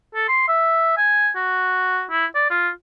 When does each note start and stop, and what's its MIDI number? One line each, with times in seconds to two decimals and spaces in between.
0.15 0.28 69
0.28 0.46 84
0.48 0.97 76
0.97 1.30 80
1.36 2.04 66
2.11 2.26 64
2.35 2.49 74
2.50 2.69 65